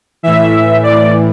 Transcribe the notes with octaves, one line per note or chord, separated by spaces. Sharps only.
A2 E3 E5
D5